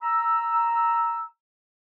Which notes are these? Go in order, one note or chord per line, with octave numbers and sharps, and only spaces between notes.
A#5 E6